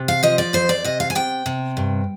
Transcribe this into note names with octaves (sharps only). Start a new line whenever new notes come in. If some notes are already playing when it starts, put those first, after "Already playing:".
Already playing: C3
F5
F3 D#5
D5
F2 C5
D5
C3 D#5
F5
G#5
C3 G5
C3
G2